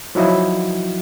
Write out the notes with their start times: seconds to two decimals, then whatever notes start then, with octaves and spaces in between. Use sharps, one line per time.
0.15 F3 F#3 D#4 E4 F#4